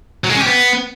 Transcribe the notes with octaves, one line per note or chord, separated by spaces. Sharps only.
F#3
G#3
C#4
G4
B3